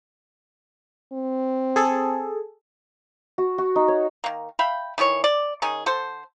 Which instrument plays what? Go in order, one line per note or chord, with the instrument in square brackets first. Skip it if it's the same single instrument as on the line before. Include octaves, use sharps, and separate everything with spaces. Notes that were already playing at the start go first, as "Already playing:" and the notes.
[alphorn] C4
[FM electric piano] G#4 A4
[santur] F#4
F#4
D#4
C#5
[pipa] D#3 A#3
E5 F5 G5 B5
D#3 E3 G#4 C#5
D5
D#3 C#4 D#4 G#4
D3 A4 C5